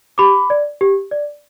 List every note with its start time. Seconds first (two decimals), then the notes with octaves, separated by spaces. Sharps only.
0.18 G4 B5 D6
0.50 D5
0.81 G4
1.11 D5